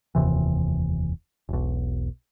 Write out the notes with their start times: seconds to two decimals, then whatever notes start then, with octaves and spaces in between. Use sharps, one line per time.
0.15 F1 D#2 C3 E3
1.49 E1 B1